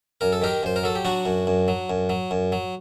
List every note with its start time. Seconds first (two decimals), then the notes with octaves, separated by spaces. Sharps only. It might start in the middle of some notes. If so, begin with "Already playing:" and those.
0.21 F#2 A#4
0.33 A4
0.42 D#3 G4 A#4
0.63 F#2 C5
0.76 A#4
0.84 F#3 A4
0.96 G4
1.05 F#3 D4 F#4
1.26 F#2
1.47 F#2
1.68 F#3
1.90 F#2
2.10 F#3
2.31 F#2
2.52 F#3